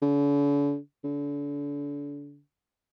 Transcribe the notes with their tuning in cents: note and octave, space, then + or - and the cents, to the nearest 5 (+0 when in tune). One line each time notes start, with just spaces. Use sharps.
D3 -45
D3 -35